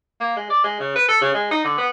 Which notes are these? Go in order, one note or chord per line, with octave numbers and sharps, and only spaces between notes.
A#3
G#3
D5
G#3
C#3
B4
A4
C#3
G#3
D#4
D3
B3